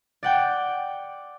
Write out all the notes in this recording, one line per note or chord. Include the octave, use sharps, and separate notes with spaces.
D5 F#5 G5